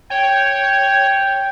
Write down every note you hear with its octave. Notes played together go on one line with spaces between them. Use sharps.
C#5 G5